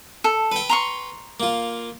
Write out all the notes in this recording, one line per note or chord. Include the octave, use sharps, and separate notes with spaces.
A4
B4 G5
A#5 C6 C#6
A#3 F4